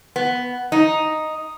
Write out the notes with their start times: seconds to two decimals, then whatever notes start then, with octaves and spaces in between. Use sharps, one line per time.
0.16 B3
0.72 D#4